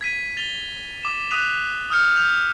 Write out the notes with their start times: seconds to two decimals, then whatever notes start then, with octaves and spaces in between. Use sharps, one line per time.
0.01 G#6 B6 D#7
0.37 A6 F7 G7
1.03 D6 E7
1.31 D#6 F#6 B6 D#7 F7
1.90 D#6 F6 G6 C#7
2.16 G6 F7